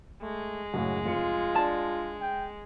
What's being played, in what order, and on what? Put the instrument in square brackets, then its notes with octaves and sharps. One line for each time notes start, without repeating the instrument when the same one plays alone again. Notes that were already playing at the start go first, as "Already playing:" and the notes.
[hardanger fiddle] G#3 [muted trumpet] A3
[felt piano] F#2 A2 C#3 [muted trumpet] F#4
[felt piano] F1 C#7 [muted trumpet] F4
[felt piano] D4 D5 [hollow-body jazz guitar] A5
[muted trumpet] G5